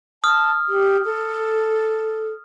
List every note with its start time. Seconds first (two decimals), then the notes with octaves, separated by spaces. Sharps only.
0.24 A5 D#6 F6
0.69 G4
1.05 A4